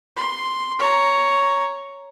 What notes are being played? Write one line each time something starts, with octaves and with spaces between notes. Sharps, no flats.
C6
C#5 A#5